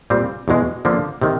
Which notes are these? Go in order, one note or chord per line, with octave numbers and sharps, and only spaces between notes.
A#2 G3 C4
E2 B2 G#3
D3 F3 A#3 D4
C3 D#3